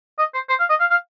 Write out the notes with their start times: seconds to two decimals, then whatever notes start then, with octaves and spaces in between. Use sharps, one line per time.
0.19 D#5
0.34 C5
0.49 C5
0.60 F5
0.70 D#5
0.80 F5
0.90 F5